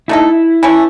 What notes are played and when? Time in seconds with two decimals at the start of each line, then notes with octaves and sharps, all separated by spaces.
0.08 A3 D#4 E4 A4
0.63 E3 A3 C#4